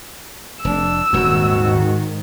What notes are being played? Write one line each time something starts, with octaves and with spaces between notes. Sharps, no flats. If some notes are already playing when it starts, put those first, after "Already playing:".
F1 D4 E6
D#1 F2 G#2 D#3 F#4